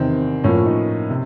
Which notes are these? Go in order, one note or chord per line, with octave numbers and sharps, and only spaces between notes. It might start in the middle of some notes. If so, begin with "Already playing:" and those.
Already playing: E2 C3 D#3 C4
A2 F3 A#3 C#4
D#4
C3